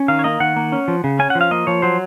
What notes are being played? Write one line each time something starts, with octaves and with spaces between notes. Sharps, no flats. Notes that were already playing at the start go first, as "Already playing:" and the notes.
Already playing: C#4
D#3 F5
C#5
A#3 D#5
D#3 F#5
A#3
C#4
F3
C#3
C#4 G#5
F#5
F3
F5
A#3 D#5
F3 C#5
F#3 C5